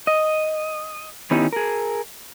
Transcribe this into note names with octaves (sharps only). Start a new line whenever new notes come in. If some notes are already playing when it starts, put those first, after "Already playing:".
D#5
D#3 B3 C#4 D#4 E4 G4
G#4 A#4